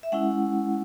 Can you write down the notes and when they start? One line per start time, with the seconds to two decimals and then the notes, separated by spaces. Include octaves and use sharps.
0.03 E5
0.12 G#3 C#4 E4 F#5